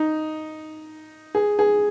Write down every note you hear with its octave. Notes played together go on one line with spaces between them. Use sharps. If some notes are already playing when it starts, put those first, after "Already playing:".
Already playing: D#4
G#4
G#4